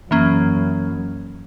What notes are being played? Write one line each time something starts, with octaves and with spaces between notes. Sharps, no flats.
F#2 E3 A#3 C#4